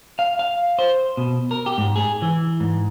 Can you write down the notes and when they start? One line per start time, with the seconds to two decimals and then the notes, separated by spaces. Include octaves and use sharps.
0.19 F5
0.39 F5
0.79 C5
1.17 B2
1.51 A#4
1.66 G4
1.78 G#2
1.96 G#4
2.22 E3
2.60 G#2